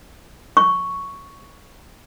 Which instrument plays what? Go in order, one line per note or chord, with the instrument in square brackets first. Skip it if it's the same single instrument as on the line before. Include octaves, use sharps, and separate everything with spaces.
[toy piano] C#6